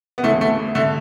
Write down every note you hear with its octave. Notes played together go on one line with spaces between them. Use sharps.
B3
D2 C#3 E3 A3
A3
D3 A3